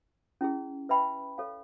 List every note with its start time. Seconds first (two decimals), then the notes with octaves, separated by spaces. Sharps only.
0.41 C#4 E4 G#4
0.89 B4 E5 G5 B5
1.38 A4 C#5 F5